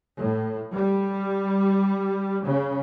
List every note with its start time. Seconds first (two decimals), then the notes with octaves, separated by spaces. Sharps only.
0.19 A2
0.75 G3
2.45 C#3